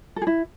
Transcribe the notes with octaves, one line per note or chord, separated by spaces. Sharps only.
A4
G#4
E4